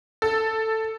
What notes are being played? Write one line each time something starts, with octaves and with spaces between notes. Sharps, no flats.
A4